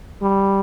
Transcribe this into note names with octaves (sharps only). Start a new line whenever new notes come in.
G3